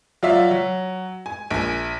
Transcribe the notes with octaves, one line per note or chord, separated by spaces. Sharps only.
F#3 F4 D5 E5 F5
F#3
G#5
A#1 G#5